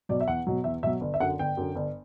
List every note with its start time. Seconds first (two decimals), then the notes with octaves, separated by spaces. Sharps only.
0.09 B2 F#3 D5
0.21 E5
0.27 E2 F#5
0.47 B2 F#3
0.64 E2 E5
0.83 B2 F#3 E5
1.01 G1
1.14 E5
1.20 F#2 D3 F#5
1.39 G1 G5
1.57 F#2 D3
1.76 G1